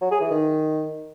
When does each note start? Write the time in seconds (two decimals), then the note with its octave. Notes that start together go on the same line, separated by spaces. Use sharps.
0.01 F#3
0.11 G#4
0.21 E3
0.31 D#3